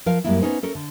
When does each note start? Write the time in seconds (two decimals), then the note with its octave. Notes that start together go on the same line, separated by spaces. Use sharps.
0.06 F3 A#4 F5
0.24 F#2 A#2 G3 G#3 A#3 E4
0.41 B3 C#4 D#4 G#4 C5
0.63 C#4 A4 A#4
0.75 D3